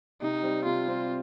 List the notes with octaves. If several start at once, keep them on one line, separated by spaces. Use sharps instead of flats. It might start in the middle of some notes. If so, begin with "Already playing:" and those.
C3 D#4
G3 C4
C3 F4
G3 C4